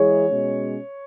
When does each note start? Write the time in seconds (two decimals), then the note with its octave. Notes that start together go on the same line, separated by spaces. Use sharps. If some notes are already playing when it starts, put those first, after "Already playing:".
Already playing: E3 G#3 E4 G#4 C#5
0.29 B2 G#3 C#4